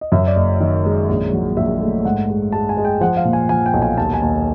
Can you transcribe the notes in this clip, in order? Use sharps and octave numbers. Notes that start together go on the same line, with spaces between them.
D#5
F#2 E5
D5
F#1 D#5
D#3
G#3
A#1
F#3
A#1 E5
A3
G#2 F#5
G#3
G#3 A5
G#5
G#3
G5
F3 F#5
F5
A#2
G#5
F3 G#5
G5
B1
G#5
D#2 A5
G#5
D#2